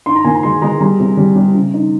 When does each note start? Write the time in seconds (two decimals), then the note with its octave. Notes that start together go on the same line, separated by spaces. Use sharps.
0.06 D#4 C6
0.15 A#5
0.24 A#2 G#5
0.35 A#5
0.43 G#3 C6
0.62 G#3 A#5
0.81 G3 A#5
1.00 C3
1.17 G3
1.36 G3
1.54 C#3
1.74 D#4